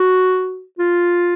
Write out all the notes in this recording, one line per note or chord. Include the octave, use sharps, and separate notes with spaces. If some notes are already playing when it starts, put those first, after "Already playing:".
Already playing: F#4
F4